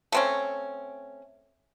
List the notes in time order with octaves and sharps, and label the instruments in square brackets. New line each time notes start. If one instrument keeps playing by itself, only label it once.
[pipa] A3 C4 C#4